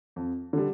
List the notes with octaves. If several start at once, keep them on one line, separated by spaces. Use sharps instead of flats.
F2
D3 G3